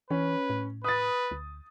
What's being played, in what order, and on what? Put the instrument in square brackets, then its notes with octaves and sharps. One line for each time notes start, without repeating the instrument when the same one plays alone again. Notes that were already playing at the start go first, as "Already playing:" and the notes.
[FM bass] E3 [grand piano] C#4 [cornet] B4
[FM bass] A2
[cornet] B4 [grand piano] D#6 A6
[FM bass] D2